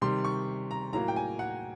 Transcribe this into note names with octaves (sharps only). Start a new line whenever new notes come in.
C3 D#3 G3 C6
C#6
A#5
A2 F#3 A#3 A#5
G5
G#5
F#5